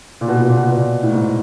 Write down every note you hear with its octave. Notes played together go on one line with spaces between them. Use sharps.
A#2
B2
A#2
B2
A#2
B2
A#2
B2
A#2
A2
G#2